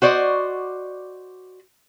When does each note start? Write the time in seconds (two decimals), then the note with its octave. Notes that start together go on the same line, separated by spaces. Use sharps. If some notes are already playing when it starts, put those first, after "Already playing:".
0.02 F#4 C5 D5 D#5